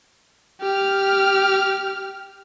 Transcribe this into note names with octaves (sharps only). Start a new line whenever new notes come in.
G4 F6